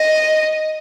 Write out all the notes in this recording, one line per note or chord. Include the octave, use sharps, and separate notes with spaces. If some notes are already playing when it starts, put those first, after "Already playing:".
Already playing: D#5